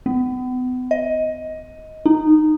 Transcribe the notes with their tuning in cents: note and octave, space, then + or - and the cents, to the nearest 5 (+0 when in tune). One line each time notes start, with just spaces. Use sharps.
B3 +35
D#5 +15
D#4 -15